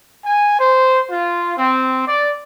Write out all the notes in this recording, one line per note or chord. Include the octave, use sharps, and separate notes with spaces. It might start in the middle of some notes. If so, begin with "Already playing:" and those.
G#5
C5
F4
C4
D5